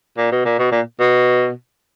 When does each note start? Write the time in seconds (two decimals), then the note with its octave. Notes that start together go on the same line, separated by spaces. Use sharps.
0.17 A#2
0.31 B2
0.45 A#2
0.59 B2
0.72 A#2
1.00 B2